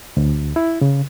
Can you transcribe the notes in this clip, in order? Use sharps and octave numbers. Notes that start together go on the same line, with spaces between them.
D2
E4
C#3